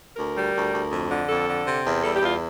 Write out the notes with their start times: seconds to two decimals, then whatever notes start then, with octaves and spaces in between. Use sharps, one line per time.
0.17 D2 A#4
0.35 G3
0.55 D2
0.73 D2
0.91 F2
1.10 D3
1.28 F2 A4
1.48 D3
1.66 C3
1.85 E2
2.03 G3 A4
2.15 G4
2.21 E2 F4